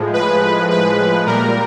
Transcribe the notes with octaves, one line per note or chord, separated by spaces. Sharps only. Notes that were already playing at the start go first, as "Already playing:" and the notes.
Already playing: A2 F3 G#3
B4
B4
A#2 G3 A#4